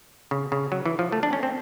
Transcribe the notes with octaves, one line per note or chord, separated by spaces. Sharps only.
C#3
C#3
F#3
E3
F3
A3
D4
C#4
C4